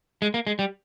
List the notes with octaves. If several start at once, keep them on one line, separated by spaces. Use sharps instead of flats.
G#3
A#3
G#3
G3